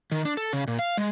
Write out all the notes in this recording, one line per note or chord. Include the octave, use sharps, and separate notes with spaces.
D#3
D4
A4
C#3
A#2
F5
G#3